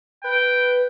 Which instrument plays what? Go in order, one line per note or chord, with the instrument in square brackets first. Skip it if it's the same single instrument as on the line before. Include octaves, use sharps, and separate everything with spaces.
[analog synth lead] B4 [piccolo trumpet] G5